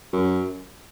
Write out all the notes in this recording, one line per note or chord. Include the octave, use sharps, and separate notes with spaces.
F#2